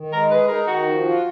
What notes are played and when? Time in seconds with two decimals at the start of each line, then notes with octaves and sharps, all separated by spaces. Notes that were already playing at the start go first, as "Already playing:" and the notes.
Already playing: D#3
0.12 G#3 A#4
0.30 G#4 B4
0.48 D#4 A#4
0.67 D#3 F#4
0.86 F3
1.04 F4